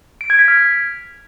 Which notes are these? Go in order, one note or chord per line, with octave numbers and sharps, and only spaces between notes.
D7
G#6
B6
F6